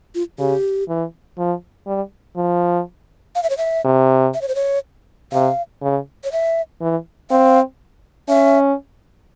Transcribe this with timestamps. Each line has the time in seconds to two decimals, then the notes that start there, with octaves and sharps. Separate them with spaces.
0.15 F4
0.39 C#3 G4
0.89 E3
1.38 F3
1.87 G3
2.36 F3
3.35 F5
3.43 E5
3.50 C#5
3.58 E5
3.85 C3
4.34 E5
4.41 C#5
4.48 C5
4.55 C#5
5.32 C3 F5
5.82 C#3
6.24 C#5
6.32 E5
6.81 E3
7.30 C4 F5
8.29 C#4 E5